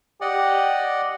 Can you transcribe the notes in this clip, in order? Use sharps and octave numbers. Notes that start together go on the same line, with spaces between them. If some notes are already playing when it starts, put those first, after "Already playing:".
G4 D5 D#5 F#5